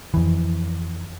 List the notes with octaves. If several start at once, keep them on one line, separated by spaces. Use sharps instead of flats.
F2 E3